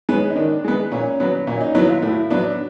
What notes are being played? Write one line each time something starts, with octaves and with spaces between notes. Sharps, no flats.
G#3 B3 C#4
D#4
D#3 D4
G#3 B3
A#2 C#4
F#3 B3
A#2 C#4
D#4
F#3 B3 E4
F4
A2 E4
F#3 B3 D4